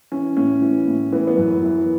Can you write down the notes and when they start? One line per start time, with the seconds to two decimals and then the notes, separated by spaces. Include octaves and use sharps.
0.12 E3 C#4
0.37 A2 C#4
0.62 E3
0.87 A2
1.13 E3 B3
1.27 B3
1.37 F#2
1.63 E3